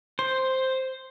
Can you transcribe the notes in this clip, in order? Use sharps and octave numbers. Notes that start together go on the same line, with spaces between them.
C5